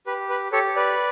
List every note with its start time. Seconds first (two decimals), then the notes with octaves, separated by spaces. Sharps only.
0.06 G4 B4
0.30 B4
0.52 G4 A4 C#5
0.76 B4 D5